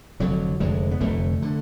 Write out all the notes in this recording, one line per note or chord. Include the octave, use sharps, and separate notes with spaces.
F1 F2 D3 F#3
F1 F2 D3 G#3
B3
F1 F2 D3 A3
D3